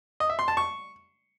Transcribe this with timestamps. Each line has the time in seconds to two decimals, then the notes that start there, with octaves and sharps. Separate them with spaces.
0.20 D#5
0.30 E5
0.39 C6
0.48 A5
0.57 C#6